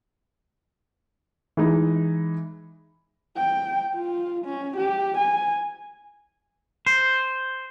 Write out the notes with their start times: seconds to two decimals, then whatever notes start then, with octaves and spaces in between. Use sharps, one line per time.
1.57 E3 G#3 D#4
3.37 G5
3.94 F4
4.45 C#4
4.77 G4
5.17 G#5
6.87 C5